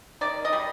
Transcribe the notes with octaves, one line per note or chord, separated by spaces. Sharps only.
D#3 D5
D#5
G3